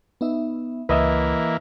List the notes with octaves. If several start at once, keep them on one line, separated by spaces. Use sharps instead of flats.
B3 D#4 E5
C#2 E3 A#3 B4 D#5 E5